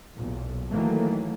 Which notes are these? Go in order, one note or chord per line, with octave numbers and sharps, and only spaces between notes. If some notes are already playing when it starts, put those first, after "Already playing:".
B1 E2 A#2
D#3 E3 F#3 A3 A#3